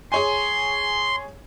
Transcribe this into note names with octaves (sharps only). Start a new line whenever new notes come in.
G#4 C#5 G#5 C6